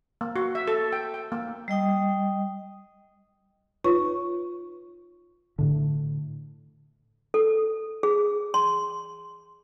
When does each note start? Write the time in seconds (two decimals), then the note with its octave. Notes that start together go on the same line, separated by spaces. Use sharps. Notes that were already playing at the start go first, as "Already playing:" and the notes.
0.21 A#3
0.36 F#4
0.55 E5
0.68 A4
0.93 G5
1.14 G5
1.32 A#3
1.68 G3 D#5 G5 D#6
3.84 D#4 F4 B4 C#5 C#6
5.59 A2 D3
7.34 A4
8.03 G#4
8.54 C6